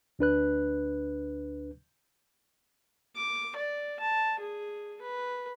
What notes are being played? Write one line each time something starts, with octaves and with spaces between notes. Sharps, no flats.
D2 D4 B4 F#6
D6
D5
A5
G#4
B4